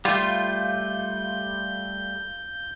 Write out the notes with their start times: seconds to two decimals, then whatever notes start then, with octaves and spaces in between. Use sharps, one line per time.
0.05 G3 A3 F4 G6